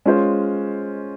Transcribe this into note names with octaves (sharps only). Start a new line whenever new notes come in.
G#3 C#4 F4 C5